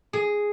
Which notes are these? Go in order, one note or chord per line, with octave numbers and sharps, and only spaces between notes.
G#4